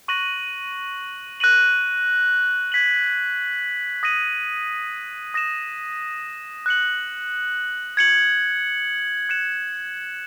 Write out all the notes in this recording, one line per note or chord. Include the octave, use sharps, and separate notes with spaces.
C#6 F#6 A#6 D#7 F#7
F#6 A#6 D#7 F#7
G#6 B6 F#7
D#6 A#6 D#7 F#7
D#6 A#6 E7
F#6 C#7 F#7
G#6 C#7 F#7
F#6 C#7 E7